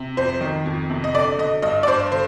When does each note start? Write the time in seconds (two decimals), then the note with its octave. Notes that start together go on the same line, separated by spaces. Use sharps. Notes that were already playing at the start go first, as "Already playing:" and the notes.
Already playing: C3
0.17 F2 C5
0.41 D#3
0.66 F2
0.90 C3
1.04 D#5
1.14 D3 D5
1.38 D3 D#5
1.62 G2 D#5
1.83 D5
1.87 G2 C5
2.12 D3 C5